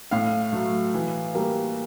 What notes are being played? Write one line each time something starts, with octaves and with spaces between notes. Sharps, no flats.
A2 F5
F#3 A3
E3
G3 A#3